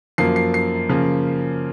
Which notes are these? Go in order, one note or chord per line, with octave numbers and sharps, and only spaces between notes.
F#2 F3 A#3 C7
C7
C7
C#3 F3 A#3